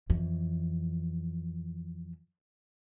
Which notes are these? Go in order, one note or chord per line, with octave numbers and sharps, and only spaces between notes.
F2 E3